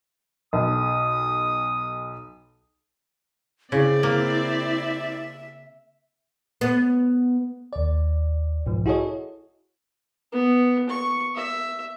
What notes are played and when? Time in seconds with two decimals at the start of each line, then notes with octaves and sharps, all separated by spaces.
0.53 B1 D#6
3.72 C#3 C4 E4 D5
4.03 A#3 E5
6.61 B3
7.73 D#2 D5
8.66 B1 G#2 F3
8.86 E4 F#4 G#4 A4 C#5 D#5
10.32 B3
10.90 C#6
11.36 E5